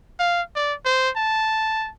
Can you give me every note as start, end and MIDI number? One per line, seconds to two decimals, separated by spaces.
0.19 0.42 77
0.55 0.74 74
0.85 1.10 72
1.16 1.90 81